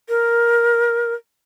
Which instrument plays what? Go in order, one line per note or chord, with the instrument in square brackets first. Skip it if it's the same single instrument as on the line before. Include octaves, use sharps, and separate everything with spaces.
[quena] A#4